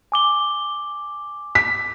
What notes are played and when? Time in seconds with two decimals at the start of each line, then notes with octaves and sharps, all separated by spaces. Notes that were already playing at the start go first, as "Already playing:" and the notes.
0.12 G#5 D6 G7
1.55 B6